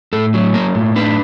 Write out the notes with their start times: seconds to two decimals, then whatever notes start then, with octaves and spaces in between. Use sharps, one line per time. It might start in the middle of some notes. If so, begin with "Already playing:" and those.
0.13 A2 A4
0.34 F#3
0.54 A#3 A#4
0.75 A2
0.96 D4 B4